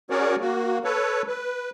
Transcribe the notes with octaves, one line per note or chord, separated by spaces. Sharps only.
C#4 F#4 G#4 A#4 C#5 D5
A#3 F#4
A4 B4 C#5
B4